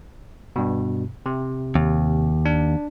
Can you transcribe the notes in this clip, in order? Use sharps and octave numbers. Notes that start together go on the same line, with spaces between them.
G2 B2
C3
D#2
D4